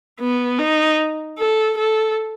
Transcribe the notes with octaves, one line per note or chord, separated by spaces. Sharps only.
B3
D#4
A4
A4